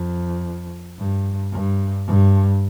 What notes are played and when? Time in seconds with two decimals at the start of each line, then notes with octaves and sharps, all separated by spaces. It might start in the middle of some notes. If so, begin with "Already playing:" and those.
Already playing: F2
0.98 G2
1.52 G2
2.08 G2